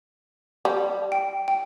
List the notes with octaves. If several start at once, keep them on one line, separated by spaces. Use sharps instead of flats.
G3
G5
G5